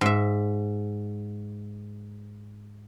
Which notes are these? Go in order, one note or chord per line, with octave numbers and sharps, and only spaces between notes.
G#2 E5